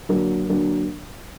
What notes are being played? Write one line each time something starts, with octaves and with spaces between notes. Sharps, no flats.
D3 F#3 A#3 D4
D3 F#3 A#3 D4